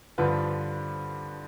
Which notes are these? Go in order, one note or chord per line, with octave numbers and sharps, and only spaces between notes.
G2 D3 F3 B4